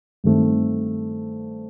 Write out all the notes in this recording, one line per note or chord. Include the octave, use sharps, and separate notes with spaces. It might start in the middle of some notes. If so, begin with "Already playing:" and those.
G2 D#3 A3 C4